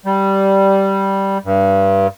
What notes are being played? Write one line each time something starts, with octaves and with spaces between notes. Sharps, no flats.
G3
G2